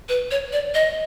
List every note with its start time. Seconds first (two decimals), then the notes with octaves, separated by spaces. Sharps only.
0.09 B4
0.31 C#5
0.53 D5
0.74 D#5